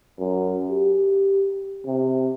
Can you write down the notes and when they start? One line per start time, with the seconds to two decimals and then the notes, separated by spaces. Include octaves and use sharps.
0.19 F#2
0.70 G4
1.86 C3